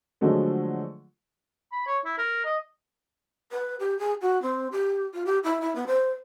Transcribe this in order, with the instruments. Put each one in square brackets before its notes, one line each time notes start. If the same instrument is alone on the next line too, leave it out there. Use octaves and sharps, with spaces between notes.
[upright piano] D3 F3 F#3 G#3 A3
[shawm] B5
C#5
E4
A#4
D#5
[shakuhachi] B4
G4
G#4
F#4
C4
G4
F4
G4
E4
E4
B3
C5